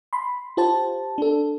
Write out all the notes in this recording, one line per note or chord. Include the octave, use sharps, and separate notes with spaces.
B5 C6
F4 G4 C5 A5
D4 A4